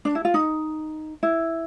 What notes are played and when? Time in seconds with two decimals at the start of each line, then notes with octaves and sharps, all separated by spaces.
0.05 D4
0.15 E4
0.25 F4
0.34 D#4
1.23 E4